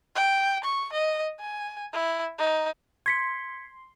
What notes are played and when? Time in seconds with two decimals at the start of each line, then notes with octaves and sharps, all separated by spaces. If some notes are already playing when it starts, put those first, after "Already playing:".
0.15 G5
0.63 C#6
0.92 D#5
1.39 G#5
1.93 E4
2.38 D#4
3.06 C6 G#6 B6 C#7